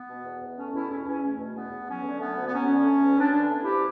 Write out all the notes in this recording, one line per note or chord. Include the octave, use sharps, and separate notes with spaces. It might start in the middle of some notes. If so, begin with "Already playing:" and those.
Already playing: B3
B2
E2
E2
A3 C#4
B2 C#4 E4
E2 C#4
E2 C#4
A3
B2
E2 B3
E2
F#3 C#4
D3
A3 B3
D2
B3
F#3 C#4
D3
A3
D2
F#3 B3 D4
D3
A3
E4 G4
D2